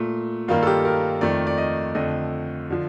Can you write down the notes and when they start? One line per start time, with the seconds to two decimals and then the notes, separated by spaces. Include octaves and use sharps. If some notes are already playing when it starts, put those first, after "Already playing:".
Already playing: A#2 A3
0.48 G2 D#3 A#3 F4
0.63 A4
0.67 G4
0.85 A#4
1.21 F2 D#3 A3 D5
1.47 D5
1.58 D#5
1.95 F2 D3 A3 D#5
2.70 D3 F3